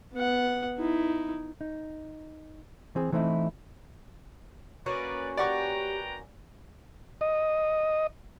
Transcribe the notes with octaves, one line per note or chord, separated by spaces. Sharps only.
B3 F#5
D#4 E4
D#4
E3 C4 G#4
E3 A3 C4 D#4 E4
A#3 C#4 F#4 B4 D5
G4 B4 D5 F#5 G5 A#5 C#6
D#5